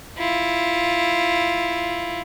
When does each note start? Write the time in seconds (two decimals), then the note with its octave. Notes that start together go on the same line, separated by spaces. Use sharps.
0.18 E4 F4